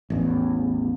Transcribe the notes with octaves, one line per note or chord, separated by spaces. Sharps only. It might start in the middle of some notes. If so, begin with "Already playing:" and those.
A1 E2